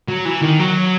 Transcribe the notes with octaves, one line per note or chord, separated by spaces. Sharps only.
F#3
E3
D#3
F#3